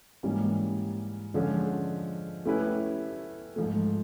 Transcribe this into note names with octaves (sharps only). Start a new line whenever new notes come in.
G#2 E3 G3 A#3 C#4
D3 F3 G#3 C#4
A3 C#4 E4 G4 B4
G#2 F3 A3